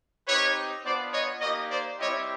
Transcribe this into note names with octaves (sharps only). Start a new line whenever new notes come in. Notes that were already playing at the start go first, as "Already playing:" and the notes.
C4 D#4 G4 B4 C#5
B3 D4 F4 C5 D5
C#5 D#5
A#3 D#4 G4 C#5 D#5
C5 D5
G3 C4 E4 G4 C#5 D#5